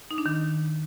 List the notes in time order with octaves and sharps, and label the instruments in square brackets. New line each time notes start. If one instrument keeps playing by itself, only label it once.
[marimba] D#4
D4
D#3